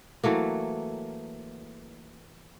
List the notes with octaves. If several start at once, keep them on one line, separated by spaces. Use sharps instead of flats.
E3 F#3 A3 A#3